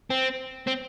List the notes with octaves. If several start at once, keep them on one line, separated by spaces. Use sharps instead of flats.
C4
C4